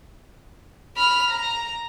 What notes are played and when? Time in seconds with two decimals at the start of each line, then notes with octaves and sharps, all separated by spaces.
0.97 B5 F6
1.31 A#5